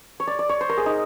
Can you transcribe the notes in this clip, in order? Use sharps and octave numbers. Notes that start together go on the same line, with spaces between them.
C#5
D5
D5
C#5
C5
A#4
G#4
D#4